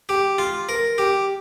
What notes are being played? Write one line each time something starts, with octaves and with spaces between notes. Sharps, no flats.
G4
F4
A#4
G4